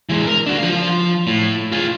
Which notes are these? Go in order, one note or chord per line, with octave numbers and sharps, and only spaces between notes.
E3 G#3
A#4
D4 F#4
F3 F5
A2
F4 G#4